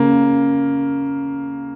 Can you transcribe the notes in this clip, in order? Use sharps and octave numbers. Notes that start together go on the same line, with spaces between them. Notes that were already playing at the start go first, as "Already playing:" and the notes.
Already playing: C#3 A#3